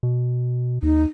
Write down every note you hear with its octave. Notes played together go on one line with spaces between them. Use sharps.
B2
D#2 D#4